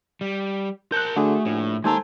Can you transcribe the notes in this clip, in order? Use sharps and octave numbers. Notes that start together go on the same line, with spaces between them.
G3
A#4 A5 F#6 G6
D3 A3 F#4 G#4
A#1 A2
D#2 G#3 A4 C5 G#5 A#5